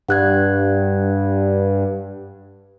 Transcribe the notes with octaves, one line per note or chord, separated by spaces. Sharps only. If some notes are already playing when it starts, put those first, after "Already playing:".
G2 F#5 F#6 G#6